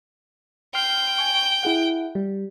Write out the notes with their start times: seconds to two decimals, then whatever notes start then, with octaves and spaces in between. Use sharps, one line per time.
0.75 G5 C6 F6 C7
1.18 G#5 C#6
1.63 E4 G#4 F#5
2.15 G3